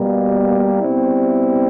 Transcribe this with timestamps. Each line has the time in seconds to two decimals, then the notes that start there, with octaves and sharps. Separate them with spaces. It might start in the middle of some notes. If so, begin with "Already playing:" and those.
Already playing: B2 G3 A#3
0.79 B2 G3 C4 E4